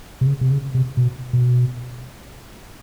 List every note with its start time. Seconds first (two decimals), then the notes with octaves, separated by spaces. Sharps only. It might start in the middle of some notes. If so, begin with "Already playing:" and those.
0.21 C3
0.26 C#3
0.41 C3
0.51 C#3
0.75 C3
0.97 B2
1.33 B2